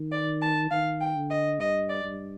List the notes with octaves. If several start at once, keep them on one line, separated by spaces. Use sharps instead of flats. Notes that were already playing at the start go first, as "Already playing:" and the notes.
Already playing: D#3
D5
A5
D#3 F5
G5
D3
D#5
G2 D#5
D5
G2